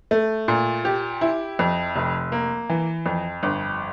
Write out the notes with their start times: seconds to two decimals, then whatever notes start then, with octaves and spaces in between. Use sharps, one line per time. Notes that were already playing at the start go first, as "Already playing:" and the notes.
0.11 A3
0.48 A#2
0.85 G4
1.21 E4
1.59 F2
1.96 F1
2.32 A#3
2.70 E3
3.06 F2
3.43 G1